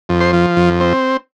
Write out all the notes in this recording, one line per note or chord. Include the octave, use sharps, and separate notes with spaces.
F2
C5
F3
F2
C4